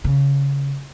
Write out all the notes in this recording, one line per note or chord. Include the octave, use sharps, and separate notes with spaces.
C#3